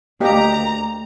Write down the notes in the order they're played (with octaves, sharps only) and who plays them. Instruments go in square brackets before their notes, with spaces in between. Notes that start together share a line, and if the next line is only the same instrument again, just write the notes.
[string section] D2 A#5 [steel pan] A#3 G4 D#5